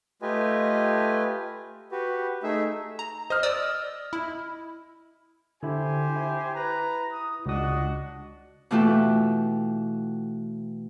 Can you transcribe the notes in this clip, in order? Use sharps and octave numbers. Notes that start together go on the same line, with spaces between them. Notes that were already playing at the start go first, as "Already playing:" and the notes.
A3 F4 G4 B4 D#5 G#5
F#4 G4 B4
A3 D#4 G#4 E5
A#5
C5 D#5 F6
D5 D#6 E6
E4
D3 E4 G4 C5 G#5
E4
B4 A#5
D#6
C#2 D4 F#4 D#5 D#6
B2 E3 A3 F4 G4 A4